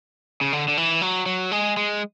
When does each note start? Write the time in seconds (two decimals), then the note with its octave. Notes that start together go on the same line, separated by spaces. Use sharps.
0.41 C#3
0.53 D3
0.68 D3
0.77 E3
1.01 F#3
1.26 F#3
1.52 G#3
1.77 G#3